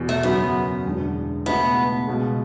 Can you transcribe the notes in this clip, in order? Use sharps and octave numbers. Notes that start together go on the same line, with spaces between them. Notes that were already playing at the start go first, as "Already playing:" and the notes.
Already playing: E2 B2
A3
F#2 C#3 F#3 B3
E1 E2 D3
C#2 B2 A3 B3 E4
C#2 B2 G#3